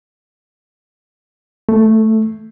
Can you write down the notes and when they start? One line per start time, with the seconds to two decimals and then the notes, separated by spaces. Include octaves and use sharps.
1.69 A3